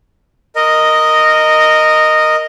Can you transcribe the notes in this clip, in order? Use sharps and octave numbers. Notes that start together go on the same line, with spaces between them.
A#4 D#5